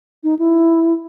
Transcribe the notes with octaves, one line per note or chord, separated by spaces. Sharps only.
D#4
E4